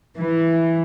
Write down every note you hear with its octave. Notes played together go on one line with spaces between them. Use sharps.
E3